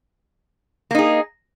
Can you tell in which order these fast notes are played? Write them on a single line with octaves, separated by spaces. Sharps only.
A#3 D#4 G#4